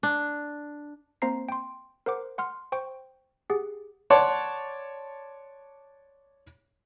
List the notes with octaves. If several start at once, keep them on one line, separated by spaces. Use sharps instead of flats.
D4
A#3 C4 C5 A#5 C7
G5 C6
A#4 C5 F#5 D6
F#5 C6 F6
C5 G5 C#6
G4 G#4 F#5
C#5 D5 F#5 A5 C6 D6